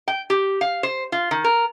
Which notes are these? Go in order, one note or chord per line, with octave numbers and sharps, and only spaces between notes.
G5
G4
F5
C5
F4
D#3
A#4